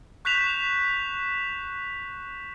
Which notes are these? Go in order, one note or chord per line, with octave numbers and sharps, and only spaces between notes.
C#6 F#6 G6 B6 E7 F7